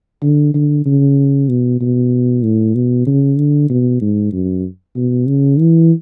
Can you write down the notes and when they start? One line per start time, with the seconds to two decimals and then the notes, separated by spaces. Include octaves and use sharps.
0.23 D3
0.54 D3
0.86 C#3
1.49 B2
1.81 B2
2.43 A2
2.75 B2
3.07 C#3
3.38 D3
3.70 B2
4.02 G#2
4.33 F#2
4.96 B2
5.28 C#3
5.59 E3